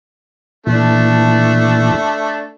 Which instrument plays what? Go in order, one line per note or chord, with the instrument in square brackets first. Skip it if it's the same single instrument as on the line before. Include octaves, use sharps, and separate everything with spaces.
[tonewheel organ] A#2 E3 [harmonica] A3 D4